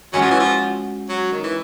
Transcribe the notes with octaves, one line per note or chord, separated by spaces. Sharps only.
F#3 G#3 C#4 F#4
F3
E3
F3
F#3
D#3
E3